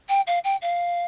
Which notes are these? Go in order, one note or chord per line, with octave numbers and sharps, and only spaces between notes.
G5
F5
G5
F5